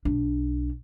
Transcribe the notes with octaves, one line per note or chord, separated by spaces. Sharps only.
B1 D4